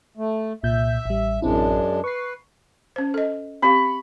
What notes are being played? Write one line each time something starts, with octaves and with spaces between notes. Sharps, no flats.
A3
C2 A#2 E5 G6
A1 G3
A1 F#2 G#3 C4 D4 E4
B4 C#6 C7
C#4 C5
A4 D#5
C4 G4 F5 B5 C#6